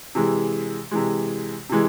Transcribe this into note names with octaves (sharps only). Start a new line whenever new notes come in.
C3 E3 G#3
C3 E3 G#3
C3 E3 G#3